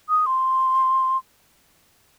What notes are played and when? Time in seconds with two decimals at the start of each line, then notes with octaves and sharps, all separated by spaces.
0.09 D#6
0.26 C6